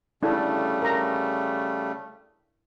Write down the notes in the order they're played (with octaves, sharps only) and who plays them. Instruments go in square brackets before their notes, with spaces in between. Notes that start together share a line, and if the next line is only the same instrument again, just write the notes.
[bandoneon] C#3 G3 A3 [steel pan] D4 E4 A4
[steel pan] A#4 A#5